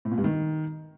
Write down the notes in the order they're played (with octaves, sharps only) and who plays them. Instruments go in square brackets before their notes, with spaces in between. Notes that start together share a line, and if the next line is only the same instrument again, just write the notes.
[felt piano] A2
A#2
G2
D#3